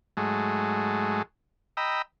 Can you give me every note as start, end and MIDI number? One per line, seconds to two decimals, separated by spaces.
0.17 1.22 44
0.17 1.22 54
0.17 1.22 56
0.17 1.22 57
1.77 2.02 75
1.77 2.02 79
1.77 2.02 82
1.77 2.02 83
1.77 2.02 88